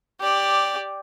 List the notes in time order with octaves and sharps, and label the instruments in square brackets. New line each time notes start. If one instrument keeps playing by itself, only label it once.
[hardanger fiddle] G4 D5